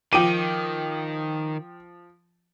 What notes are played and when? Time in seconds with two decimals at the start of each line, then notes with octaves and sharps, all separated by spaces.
0.13 D#3 F3 G5 D6 D#7